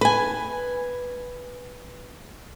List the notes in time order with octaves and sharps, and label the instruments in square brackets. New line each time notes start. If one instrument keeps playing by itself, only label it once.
[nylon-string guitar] B4 G#5